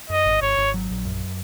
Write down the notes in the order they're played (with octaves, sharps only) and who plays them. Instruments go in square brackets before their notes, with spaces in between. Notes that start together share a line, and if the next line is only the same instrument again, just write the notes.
[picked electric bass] F#2 [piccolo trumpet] D#5
[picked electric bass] G#1
[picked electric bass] G#1 [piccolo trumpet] C#5
[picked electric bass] G#1
F#3
A#1
F#2